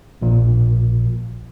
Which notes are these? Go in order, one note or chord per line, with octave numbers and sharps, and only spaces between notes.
A#1 A#2